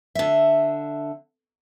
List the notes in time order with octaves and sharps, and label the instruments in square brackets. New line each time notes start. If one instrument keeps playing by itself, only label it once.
[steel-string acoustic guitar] D3 E5